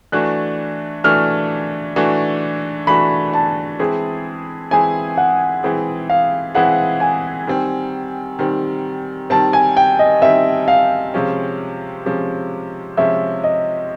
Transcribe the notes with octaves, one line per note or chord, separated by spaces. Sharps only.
E3 A3 D4 F#4 F#6
E3 A3 D4 F#4 F6
E3 A3 D4 F#4
E3 A3 D4 F#4 B5
A5
E3 G#3 C4 E4 G#4
E3 G#3 C4 E4 G#4 G#5
F#5
E3 G#3 C4 E4 G#4
F5
E3 G#3 C4 E4 G#4 F#5
G#5
D#3 G3 C4
D#3 G3 C4
D#3 G3 C4 A5
G#5
G5
D#5
D#3 G3 C4 E5
F5
C3 F3 G#3 C#4
C3 F3 G#3 C#4
C3 F3 G#3 C#4 E5
D#5